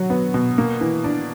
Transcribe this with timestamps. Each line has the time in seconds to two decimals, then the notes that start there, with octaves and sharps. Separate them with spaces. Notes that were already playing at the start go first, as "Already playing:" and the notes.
Already playing: F#3 F#4
0.10 B3
0.34 B2
0.58 A#3
0.81 E3
1.04 D4